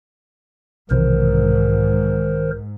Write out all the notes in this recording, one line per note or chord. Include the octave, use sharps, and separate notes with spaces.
B1 G#2 C3 D#3 E3 A#4 C5